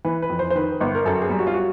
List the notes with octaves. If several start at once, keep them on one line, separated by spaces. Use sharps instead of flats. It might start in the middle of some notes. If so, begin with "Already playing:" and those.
E3 B4
B4
F2
C5
C5
D#3 B4
G1
A#4
F#2 A4
G#4
G3
F#4
F4
F#4